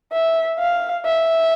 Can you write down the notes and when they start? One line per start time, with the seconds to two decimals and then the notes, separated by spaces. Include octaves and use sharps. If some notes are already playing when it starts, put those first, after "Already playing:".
0.13 E5
0.59 F5
1.06 E5